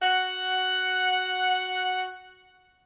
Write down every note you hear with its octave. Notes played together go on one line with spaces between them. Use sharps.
F#4 F#5